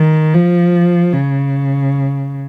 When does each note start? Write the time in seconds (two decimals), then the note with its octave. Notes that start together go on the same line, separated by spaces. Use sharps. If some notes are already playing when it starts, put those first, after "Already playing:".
Already playing: D#3
0.33 F3
1.13 C#3